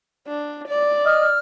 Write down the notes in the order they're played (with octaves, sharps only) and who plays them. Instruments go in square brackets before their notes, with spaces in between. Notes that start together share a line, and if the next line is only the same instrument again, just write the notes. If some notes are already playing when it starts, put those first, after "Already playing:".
[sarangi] D4
D5
[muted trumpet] D#5 [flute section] E6 F6